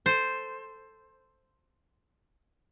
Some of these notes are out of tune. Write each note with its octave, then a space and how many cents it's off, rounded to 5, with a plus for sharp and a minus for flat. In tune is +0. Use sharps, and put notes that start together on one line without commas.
A4 +5 C5 +0